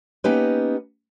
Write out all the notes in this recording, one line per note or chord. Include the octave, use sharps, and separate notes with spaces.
A#3 B3 C#4 D#4 G4 B4